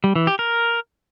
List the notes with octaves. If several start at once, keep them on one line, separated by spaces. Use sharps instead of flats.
G3
E3
G4
A#4